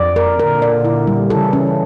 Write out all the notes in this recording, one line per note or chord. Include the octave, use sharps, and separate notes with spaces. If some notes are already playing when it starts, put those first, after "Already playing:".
Already playing: F2 D5
A#4
A#2 D3 A#4
D5
E4
G3
C#3 E3 A4
C#4